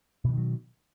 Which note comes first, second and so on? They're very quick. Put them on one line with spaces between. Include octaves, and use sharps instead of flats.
B2 E3 D#3 F#3